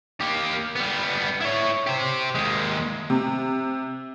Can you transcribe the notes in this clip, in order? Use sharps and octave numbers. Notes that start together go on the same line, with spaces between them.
A#3 G4
G3 B3
E4 C#5
G4 C5
D#2 G#3
C3